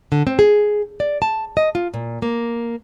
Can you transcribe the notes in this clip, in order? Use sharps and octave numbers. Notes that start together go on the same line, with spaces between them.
D3
C4
G#4
D5
A5
D#5
F4
A#2
A#3